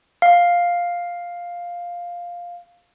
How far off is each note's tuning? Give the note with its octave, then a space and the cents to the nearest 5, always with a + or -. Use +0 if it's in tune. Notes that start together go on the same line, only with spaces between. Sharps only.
F5 +5